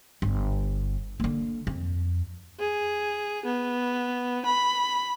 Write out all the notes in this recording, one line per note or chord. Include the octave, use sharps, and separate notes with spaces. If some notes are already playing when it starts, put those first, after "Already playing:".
G1
D3 A#3
F2
G#4
B3
B5